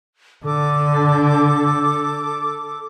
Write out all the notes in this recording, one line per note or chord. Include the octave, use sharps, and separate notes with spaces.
D3 A4 D6